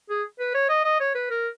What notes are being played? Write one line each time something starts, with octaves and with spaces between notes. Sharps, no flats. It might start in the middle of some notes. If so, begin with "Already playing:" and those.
G#4
B4
C#5
D#5
D#5
C#5
B4
A#4